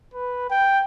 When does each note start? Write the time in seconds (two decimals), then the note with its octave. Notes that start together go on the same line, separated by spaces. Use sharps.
0.14 B4
0.50 G5